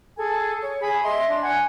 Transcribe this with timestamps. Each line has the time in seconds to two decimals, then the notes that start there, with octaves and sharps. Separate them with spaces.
0.18 G#4 A4 G#5
0.63 C#5
0.80 G#4 B5
1.03 D#5 E5 C6
1.29 D4
1.41 F#5 G#5